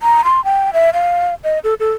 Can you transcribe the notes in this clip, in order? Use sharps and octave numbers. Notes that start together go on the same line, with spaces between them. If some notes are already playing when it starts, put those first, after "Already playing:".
A#5
C6
G5
E5
F5
D#5
A4
A4